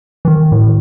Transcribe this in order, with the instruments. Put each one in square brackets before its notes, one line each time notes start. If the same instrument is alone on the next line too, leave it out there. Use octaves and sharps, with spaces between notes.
[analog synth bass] E3
D#3
A2